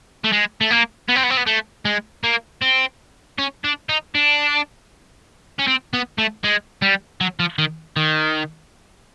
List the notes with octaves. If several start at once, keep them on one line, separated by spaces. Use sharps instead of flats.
A3
G#3
A3
A#3
B3
C4
B3
C4
B3
A3
G#3
A#3
C4
C#4
D4
D#4
D4
C#4
C4
B3
A3
G#3
G3
F#3
F3
D#3
D#3